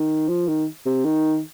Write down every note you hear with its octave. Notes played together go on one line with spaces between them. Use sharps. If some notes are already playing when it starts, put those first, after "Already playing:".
Already playing: D#3
F3
D#3
C3
D#3